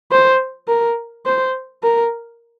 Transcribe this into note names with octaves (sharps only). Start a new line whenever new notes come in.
C5
A#4
C5
A#4